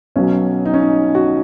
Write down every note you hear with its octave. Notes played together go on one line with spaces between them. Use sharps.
B1 B2 F#3 C#4
D#4
C#4
D#4
F#4